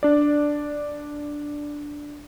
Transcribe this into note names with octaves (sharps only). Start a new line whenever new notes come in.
D4 D5